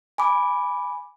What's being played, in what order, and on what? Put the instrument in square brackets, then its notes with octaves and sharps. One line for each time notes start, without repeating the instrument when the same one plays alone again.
[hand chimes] G#5 B5 D6